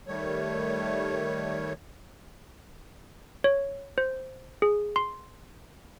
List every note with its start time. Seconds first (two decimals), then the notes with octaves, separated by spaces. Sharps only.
0.07 D#3 G3 A3 C#5
3.44 C#5
3.98 C5
4.62 G#4
4.96 C6